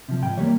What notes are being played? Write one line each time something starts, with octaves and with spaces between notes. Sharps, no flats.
C3 F3
G#2 G5
E3 G3 A#3 C#5